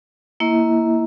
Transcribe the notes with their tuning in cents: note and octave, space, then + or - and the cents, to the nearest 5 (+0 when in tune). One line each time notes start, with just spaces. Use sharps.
A#3 +0 E4 +0 E5 -45